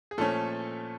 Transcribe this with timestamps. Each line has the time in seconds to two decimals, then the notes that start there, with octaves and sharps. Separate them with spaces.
0.11 G#4
0.18 A#2 F3 A3 C#4 A4